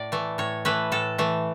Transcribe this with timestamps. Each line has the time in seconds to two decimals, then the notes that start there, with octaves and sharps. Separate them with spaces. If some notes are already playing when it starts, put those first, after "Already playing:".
Already playing: A2 D5
0.12 E3 A3
0.38 A2 C#5
0.65 E3 A3 B4
0.92 A2 A4
1.18 E3 A3